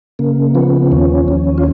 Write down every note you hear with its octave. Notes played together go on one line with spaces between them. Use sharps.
C#3 A#3
F3 B3
D#2 C#4
D#2
F4